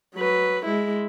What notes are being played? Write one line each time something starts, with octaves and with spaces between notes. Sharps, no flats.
F#3 B4
G#3 E4